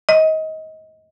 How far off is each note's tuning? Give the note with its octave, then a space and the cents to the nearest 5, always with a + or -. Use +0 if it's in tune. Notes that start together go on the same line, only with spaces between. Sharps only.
D#5 +25